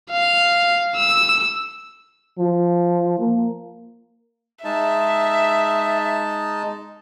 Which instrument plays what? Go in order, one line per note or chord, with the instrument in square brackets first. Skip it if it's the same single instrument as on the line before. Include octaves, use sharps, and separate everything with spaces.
[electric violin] F5
E6
[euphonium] F3
A#3
[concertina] G#3 D#4 A5 [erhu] E5